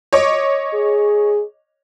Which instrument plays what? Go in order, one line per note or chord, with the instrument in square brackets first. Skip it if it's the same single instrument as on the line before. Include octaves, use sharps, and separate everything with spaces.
[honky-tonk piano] C#5 D#5 D6
[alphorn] G#4